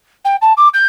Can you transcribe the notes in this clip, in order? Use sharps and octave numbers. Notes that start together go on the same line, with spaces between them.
G5
A5
D6
G6